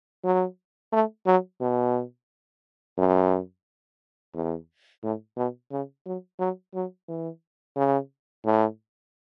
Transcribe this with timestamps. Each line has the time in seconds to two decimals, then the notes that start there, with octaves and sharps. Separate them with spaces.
0.24 F#3
0.93 A3
1.26 F#3
1.61 B2
2.98 F#2
4.34 E2
5.03 A2
5.37 B2
5.71 C#3
6.06 F#3
6.40 F#3
6.74 F#3
7.08 E3
7.77 C#3
8.45 A2